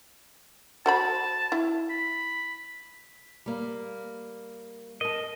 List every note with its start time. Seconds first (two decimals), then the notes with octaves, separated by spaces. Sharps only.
0.86 F#4 C5 A5 B5
1.52 E4
1.90 B5
3.46 G3 A#3
5.01 A#4 D#5 A5